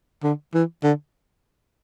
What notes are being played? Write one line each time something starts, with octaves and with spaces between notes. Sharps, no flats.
D3
E3
D3